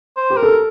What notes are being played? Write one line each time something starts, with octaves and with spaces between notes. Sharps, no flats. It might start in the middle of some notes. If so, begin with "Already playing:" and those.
C5
G4
A#4
A4